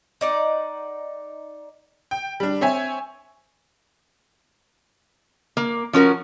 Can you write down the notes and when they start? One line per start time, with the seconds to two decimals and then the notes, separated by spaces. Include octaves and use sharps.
0.21 D#4 D5 F#5
2.11 G5
2.40 G3 D4
2.61 C4 C5 C#5 E5 G#5
5.57 A#3
5.93 F3 C#4 F#4 A#4